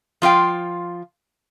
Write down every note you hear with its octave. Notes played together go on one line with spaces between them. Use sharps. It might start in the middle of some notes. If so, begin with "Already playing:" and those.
F3 F4 F5 G5